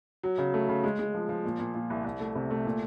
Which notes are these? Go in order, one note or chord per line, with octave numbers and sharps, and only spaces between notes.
F#3
C#3
A3
C#3
G#3
G#3
F3
F3
A#2
A#2
A#2
C2
C2
A3
C3
A3
A#2